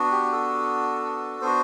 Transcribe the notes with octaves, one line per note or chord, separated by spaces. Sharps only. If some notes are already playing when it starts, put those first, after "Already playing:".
Already playing: B3 D4 F#4
G4
A4
B3 D4 F#4 C5